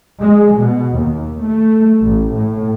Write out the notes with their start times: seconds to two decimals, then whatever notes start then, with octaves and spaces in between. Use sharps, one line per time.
0.21 G#3
0.58 B2
0.98 D#2
1.43 A3
2.04 A1
2.33 A2